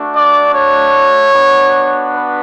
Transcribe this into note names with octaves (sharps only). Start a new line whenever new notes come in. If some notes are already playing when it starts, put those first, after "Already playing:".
Already playing: A3 D4 F#4
D5
C#5
B3 D4 F#4
B4